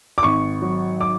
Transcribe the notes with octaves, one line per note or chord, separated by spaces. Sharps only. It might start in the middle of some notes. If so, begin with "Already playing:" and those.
D6
G#1 C#6
F#3
D6